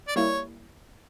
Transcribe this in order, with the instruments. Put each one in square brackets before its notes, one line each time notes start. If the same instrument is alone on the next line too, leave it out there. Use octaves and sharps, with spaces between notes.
[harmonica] D5
[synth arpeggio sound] G3 A#3 E4 [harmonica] C#5